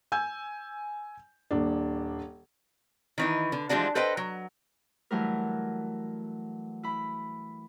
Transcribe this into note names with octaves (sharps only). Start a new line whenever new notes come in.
G#5 E6 G6
D#1 D4
D#3 E3 D#4
D3
E3 F3 G3 G#3 D4 F#4
A4 B4 C5 D#5 G5
F#3
E3 F#3 G3 A3 E4 A#4
E4 B5